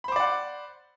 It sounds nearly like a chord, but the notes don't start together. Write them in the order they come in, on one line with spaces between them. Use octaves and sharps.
B5 C5 D6 D5 F#5